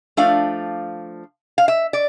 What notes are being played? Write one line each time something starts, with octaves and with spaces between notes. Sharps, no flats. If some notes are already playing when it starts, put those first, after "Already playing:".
F3 A3 D4 F5
F5
E5
D5